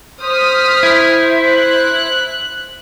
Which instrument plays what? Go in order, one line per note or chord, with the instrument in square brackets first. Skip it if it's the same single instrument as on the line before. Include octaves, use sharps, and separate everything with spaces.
[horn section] C5 [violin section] D#6 F6 B6
[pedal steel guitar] E4
[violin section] F#6